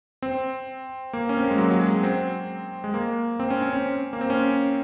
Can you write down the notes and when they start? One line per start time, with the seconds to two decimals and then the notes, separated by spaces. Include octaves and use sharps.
0.22 C4
1.13 A#3
1.29 C#4
1.37 C4
1.44 A#3
1.51 G#3
1.58 F#3
1.70 F#3
1.81 G#3
2.03 C4
2.84 G#3
2.94 A#3
3.40 C4
3.50 C#4
3.62 C#4
3.73 C4
4.13 A#3
4.21 C4
4.30 C#4